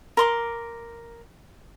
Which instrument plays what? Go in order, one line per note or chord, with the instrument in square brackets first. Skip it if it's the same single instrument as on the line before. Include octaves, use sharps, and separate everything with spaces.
[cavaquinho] A#4 C6 D6